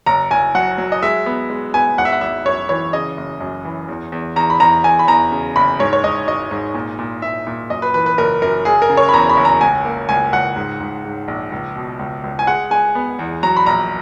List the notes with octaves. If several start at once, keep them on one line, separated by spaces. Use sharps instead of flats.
F#1 A#5
F#1 G#5
F#3 F#5
F#3
D#5
G#3 E5
B3
G#3
B3 G#5
G#1 F#5
E5
F#5
G#1 E5
F#2 C#5
E3 C#5
C#3 D#5
F#1
F#2
E3
E2
E2
E2 A#5
B5
E2 A#5
E2 G#5
B5
E2 A#5
C#3
F#1 B5
G#2 C#5
C#5
G#2 D#5
G#1 D#5
G#2
A#2
A#2
A#2 E5
A#2
F#2 D#5
B4
E3 B4
B4
F#1 A#4
F#2 A#4
F#1 G#4
A#4
C#3
C#5
B5
E2 A#5
B5
F#1
A#5
C#2 G#5
A#3
C#2 G#5
C#2 F#5
G#2
G#2
G#2
A#1
C#2
B2
C#2
C#2
G#5
G#3 F#5
G#3 G#5
B3
E2
F#3 A#5
B5
A#1 A#5